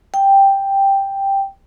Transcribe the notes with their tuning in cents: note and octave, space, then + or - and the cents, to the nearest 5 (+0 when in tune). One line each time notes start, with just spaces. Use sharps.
G5 +5